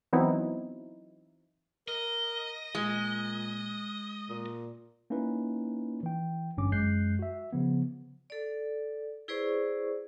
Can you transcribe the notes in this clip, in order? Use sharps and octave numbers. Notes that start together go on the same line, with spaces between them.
E3 F#3 B3 C4 D#4 E4
A#4 D#5
A#2 G#3
A#2
A#3 C#4 D#4 E4 B4
E3 G5
G1 G2 C#4 D6
F#2 G#3 F#6 G6 C7
F#4 E5
C#3 F3 B3
A4 D5
E4 G#4 B4 C5 D5 C#6